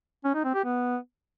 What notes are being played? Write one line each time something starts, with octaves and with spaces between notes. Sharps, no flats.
C#4
D#4
C4
G4
B3